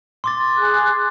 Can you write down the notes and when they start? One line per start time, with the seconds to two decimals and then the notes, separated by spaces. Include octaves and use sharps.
0.24 C6 D6 A6
0.58 G#4 F#6